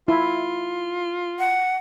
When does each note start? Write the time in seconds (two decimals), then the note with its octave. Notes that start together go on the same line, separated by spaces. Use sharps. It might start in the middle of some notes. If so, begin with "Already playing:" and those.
0.08 E4 F4
1.39 F#5